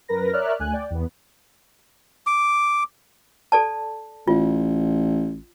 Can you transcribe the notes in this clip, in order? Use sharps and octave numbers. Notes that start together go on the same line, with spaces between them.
F#2 A#4 B4 A#6
A#4 C#5 D5 E5 F6 F#6
D2 A3 G#5 F#6
D5 G5
E2 B3
D6
A4 D5 A5
A1 F4